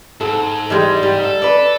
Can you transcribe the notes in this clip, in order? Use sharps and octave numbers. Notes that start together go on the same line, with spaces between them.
G#2 A4
E3 G3 G#3
G3
A4
B4 D5